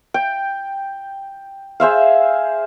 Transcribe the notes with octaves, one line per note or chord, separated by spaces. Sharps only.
G5
G#4 C5 E5 F5